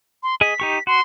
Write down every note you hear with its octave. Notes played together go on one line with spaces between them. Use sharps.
C6
G#4 D#5 B6
D#4 G4 C#6
F#4 C6